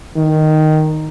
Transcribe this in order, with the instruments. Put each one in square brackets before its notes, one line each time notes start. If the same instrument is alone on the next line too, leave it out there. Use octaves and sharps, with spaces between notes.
[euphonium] D#3